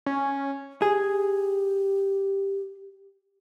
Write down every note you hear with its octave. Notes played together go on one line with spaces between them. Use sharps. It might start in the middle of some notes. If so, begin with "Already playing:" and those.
C#4
G4 G#4